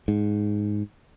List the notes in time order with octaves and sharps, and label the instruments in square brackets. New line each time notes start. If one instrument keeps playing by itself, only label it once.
[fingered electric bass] G#2